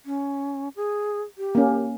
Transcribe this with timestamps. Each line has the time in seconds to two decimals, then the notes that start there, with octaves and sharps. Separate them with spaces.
0.06 C#4
0.76 G#4
1.38 G4
1.55 A#3 C#4